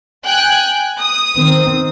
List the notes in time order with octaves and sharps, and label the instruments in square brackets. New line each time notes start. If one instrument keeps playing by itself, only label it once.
[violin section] G5 G#5 F#6
D#6
[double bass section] D#3 C4